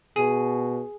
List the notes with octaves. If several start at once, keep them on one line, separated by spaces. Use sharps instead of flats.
B2 G#4